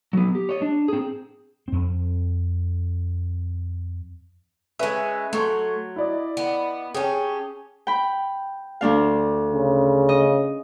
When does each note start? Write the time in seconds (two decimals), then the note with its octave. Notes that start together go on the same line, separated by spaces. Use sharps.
0.13 F#3 B3
0.35 G4
0.49 C#5 D#5
0.62 D4
0.88 C4 G#4
1.68 F2 C4
4.79 G#3 C#4 B4 E5 E6
5.33 F#3 A3 C6 C#6
5.96 E4 D5 D#5
6.37 B3
6.94 C#4 G4 G#4 C#5 A5
7.87 G5 B5
8.81 D2 D4 F5
9.53 C#3
10.09 D#5